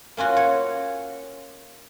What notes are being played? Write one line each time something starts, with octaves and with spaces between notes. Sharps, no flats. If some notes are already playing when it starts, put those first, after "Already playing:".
A#3 C#4 F4 F#4
C#5